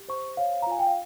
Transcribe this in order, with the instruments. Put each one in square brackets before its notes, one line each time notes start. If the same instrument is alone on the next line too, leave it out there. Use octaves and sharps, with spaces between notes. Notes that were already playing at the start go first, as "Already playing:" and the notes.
Already playing: [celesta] G4
C5 C#6
C#5 F5
A#5
F4 G#5
G5
F5